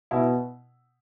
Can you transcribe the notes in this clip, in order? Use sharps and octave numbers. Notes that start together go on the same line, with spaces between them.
B2 E4